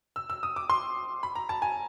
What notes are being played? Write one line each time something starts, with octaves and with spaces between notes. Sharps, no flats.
E6
E6
D#6
D6
C6
B5
A#5
A5
G#5